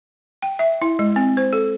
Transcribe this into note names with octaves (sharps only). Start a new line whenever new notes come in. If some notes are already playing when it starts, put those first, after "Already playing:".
G5
E5
E4
G#3
C4
C5
A4